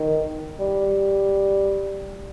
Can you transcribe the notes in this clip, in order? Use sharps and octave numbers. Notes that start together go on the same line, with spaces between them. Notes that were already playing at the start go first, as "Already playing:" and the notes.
Already playing: D#3
G3